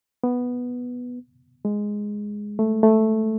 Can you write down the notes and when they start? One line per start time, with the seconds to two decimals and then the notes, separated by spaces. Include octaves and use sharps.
0.24 B3
1.65 G#3
2.59 A3
2.83 A3